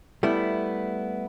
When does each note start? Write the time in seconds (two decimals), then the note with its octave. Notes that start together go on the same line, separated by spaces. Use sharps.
0.23 G3 A3 B3 E4